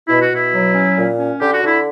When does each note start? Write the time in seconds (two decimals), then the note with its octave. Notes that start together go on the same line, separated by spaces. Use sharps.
0.08 B2 E4
0.20 F#4
0.30 B2 E4
0.52 F#3
0.74 C#4
0.96 A#2
1.17 C#4
1.39 D3 G4
1.52 F#4
1.61 D3 E4